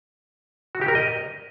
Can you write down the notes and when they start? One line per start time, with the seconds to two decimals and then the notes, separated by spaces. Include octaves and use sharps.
0.75 F#4
0.81 G4
0.88 A#4
0.95 D#5